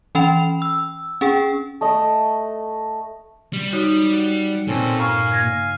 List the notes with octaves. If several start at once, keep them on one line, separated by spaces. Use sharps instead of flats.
E3 C#4 G5 B5 F7
E6
C#4 G#4 G5
A3 D#5
G3
D#4 F#4 C#5
F#5
A#2 C4 C#4 A4
G2 F5 G#5 C#6
C#3 G#6 A#6